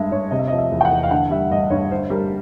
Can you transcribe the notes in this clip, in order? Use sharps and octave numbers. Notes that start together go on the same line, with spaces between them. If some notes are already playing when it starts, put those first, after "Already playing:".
Already playing: G2 G#3 E5
G2 C#5
C3 D#5
E5
D#5
F3
E5
E2
G5
F#5
E2
F5
D3 F#5
G3 E5
G2 D#5
G2 C#5
D3 C5
G3 A#4